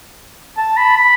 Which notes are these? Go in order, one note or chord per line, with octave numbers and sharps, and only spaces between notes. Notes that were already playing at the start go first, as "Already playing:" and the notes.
A5
B5
B5